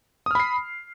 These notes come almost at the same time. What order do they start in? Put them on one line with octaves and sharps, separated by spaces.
D#6 F6 B5 C7